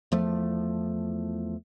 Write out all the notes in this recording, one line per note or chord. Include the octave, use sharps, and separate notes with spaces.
E2 F3 A3